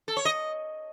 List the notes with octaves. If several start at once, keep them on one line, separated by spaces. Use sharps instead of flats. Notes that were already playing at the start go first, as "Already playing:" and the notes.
A4
C#5
D#5